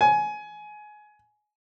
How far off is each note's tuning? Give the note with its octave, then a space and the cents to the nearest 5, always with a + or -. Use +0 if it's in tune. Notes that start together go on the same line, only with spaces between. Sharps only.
G#5 +20